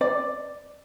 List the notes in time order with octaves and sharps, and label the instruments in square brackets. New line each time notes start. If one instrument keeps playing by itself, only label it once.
[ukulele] D5